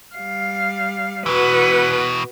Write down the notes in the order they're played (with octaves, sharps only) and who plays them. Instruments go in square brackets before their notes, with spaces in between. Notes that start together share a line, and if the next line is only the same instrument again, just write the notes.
[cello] G3 F5
[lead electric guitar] B2 E3 [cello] F#4 B4